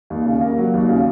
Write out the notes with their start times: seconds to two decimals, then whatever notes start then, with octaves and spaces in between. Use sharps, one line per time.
0.10 D#2
0.26 C#3
0.41 A#3
0.58 F#3
0.74 D#2
0.89 C#3